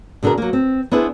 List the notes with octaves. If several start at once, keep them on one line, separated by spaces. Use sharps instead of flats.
B2 D3 D4 G#4 A#4
F#3 A#3
C4
B3 D4 E4 G#4 C5